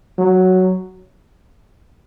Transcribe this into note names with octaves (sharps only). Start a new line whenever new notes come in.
F#3